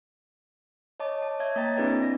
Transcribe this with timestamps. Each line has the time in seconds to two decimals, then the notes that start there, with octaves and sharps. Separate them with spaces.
1.00 C#5 D#5 A5 D6
1.22 A5
1.40 C#5 E5 G#6
1.56 A#3 C#5 D#5 G5 A#5 A6
1.77 C4 D4 E4 G#4 B4 D5
2.02 A#6